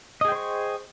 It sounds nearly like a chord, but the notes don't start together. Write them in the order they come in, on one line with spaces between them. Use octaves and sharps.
D#5 G#4 G5 C5 C#6